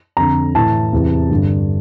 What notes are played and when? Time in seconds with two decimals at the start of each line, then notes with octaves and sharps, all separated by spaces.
0.17 F2 D3 A#5
0.55 A2 E3 A5
0.93 E2 C3 E3
1.31 G2 D3